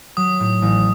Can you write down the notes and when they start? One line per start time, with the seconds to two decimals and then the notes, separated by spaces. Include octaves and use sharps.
0.17 F#3 D#6
0.40 A2
0.62 A1